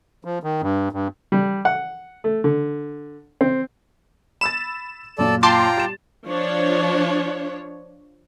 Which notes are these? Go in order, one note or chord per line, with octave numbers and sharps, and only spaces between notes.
F3
D#3
G2
G2
G3
F#5
A3
D3
C4
B5 E6 A6 E7
F#2 A#2 A4 D5
F4 G5 A5 A#5 C6 D6
G3 A6 E7
F3 D4 C#5